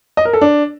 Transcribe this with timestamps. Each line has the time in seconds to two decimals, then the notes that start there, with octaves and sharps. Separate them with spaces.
0.17 D#5
0.25 A#4
0.33 A4
0.41 D4